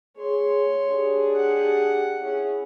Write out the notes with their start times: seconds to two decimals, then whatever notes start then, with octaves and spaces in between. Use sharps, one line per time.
0.18 G#4 C#5 C6
0.88 D4 G4 G#4
1.36 F#5
2.21 C#4 E4 G#4